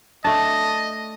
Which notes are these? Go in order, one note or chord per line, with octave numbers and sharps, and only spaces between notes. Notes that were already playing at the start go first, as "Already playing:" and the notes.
A3 D4 D#5 A5